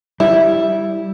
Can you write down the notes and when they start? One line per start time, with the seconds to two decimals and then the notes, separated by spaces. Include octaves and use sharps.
0.20 G3 E4